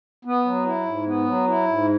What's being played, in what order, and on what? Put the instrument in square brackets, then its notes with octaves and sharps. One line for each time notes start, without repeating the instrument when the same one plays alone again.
[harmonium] B3
F#3
E4
G#2
B3
F#3
E4
G#2